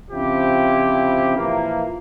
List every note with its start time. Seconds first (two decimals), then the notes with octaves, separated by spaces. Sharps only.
0.11 C#3 F3 C4 E4 G4
1.37 A#2 E3 F3 A#3